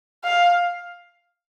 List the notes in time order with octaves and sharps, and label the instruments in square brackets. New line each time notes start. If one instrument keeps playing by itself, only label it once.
[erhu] F5